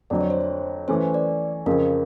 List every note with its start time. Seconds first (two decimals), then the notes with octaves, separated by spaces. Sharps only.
0.10 F2 D3 F#3 D5
0.21 C#5
0.30 C5
0.40 C#5
0.88 E3 A3 C#4 C5
1.14 D5
1.66 F2 C#3 F3 A#4